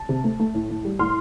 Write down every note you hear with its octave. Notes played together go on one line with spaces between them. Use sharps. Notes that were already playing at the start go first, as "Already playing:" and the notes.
Already playing: A5
C3
A3
A3
A2
A2
G3
A2 C6 F6